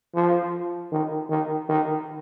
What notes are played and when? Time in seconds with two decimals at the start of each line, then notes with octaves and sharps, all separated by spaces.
0.15 F3
0.92 D#3
1.30 D#3
1.69 D#3